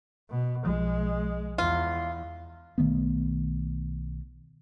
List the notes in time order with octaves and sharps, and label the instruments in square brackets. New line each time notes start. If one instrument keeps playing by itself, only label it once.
[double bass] B2
[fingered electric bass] B1 F3 [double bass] G#3
[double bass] E2 [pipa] F4
[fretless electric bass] B1 D#3 A3 B3